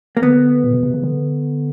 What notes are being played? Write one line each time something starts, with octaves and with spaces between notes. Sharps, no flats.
A#3
D3 B3
A#2
B2
C3
C#3
D3